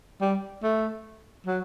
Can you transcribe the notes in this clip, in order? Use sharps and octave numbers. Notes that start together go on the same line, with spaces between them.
G3
A3
F#3